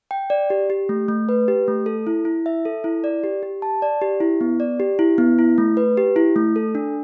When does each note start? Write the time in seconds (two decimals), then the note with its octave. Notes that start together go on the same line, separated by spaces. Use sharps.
0.11 G5
0.30 D5
0.50 G4
0.70 G4
0.89 A3
1.08 A3
1.29 B4
1.48 G4
1.68 A3
1.86 A4
2.07 E4
2.25 E4
2.46 E5
2.65 A4
2.84 E4
3.04 D5
3.24 G4
3.43 G4
3.62 A5
3.82 D5
4.01 G4
4.20 E4
4.41 B3
4.60 D5
4.80 G4
4.99 E4
5.18 B3
5.39 E4
5.58 A3
5.77 B4
5.97 G4
6.16 E4
6.36 A3
6.56 A4
6.75 D4